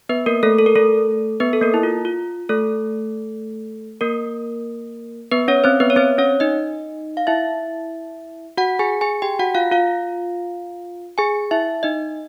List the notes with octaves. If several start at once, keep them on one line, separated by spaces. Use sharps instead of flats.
B3 B4
A#3 A#4
A3 A4
A4
A#4
A3 A4
B3 B4
A4
A#3 A#4
E4
F4
F4
A3 A4
A#3 A#4
B3 B4
C#4 C#5
C4 C5
B3 B4
C#5
C4 C5
C#4 C#5
D#4 D#5
F5
E4 E5
F#4 F#5
G#4 G#5
G#4 G#5
G4 G5
F#4 F#5
F4 F5
F4 F5
G#4 G#5
E4 E5
D#4 D#5